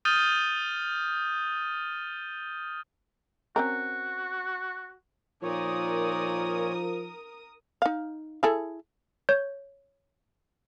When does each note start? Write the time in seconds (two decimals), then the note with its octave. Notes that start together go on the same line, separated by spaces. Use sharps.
0.05 D#6 F6 G6 A6 D#7 G7
3.56 C4 C#4 F#4 A#4
5.43 A#2 F3 D#4 A#4 C#5 D5 D#6
7.82 D#4 F5
8.43 E4 G#4 A4
9.29 C#5 G6